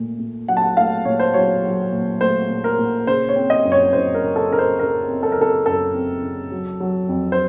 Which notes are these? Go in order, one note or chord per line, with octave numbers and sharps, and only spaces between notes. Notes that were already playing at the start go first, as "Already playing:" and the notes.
Already playing: A#2 A3
A#2
F#3 F#5
A5
F#5
A3 F5
A#2 C#5
C5
F#3 C#5
F#3
A#2
A3 C5
A#2
A#4
A#2
C#3 C5
C#5
C4
D#5
F#2
C#5
F#2 C5
A#4
C#3
A4
C#3 A#4
C5
C#3 A#4
C4
A4
A#4
C#3 A4
F#2 A4
C4
C#3
F#3
F#3
F2
C5